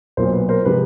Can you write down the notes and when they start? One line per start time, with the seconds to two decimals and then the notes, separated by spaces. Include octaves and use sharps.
0.17 B1 A#2 F#3 A#4 C5
0.33 B4
0.49 A#4 C5
0.65 C3 F3 G#3 B4